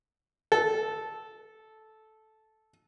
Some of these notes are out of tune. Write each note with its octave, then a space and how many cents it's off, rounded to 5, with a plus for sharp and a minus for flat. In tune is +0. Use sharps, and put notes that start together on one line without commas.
A4 -10